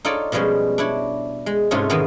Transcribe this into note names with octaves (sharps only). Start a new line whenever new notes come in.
D#4 F4 A4 C#5 D5
B2 F3 G3 G#3 C#4
D4 E4 C#5
G#3
G#2 C3 A3 C#4 F4 G#4
B2 D#3 E3 G#3 B3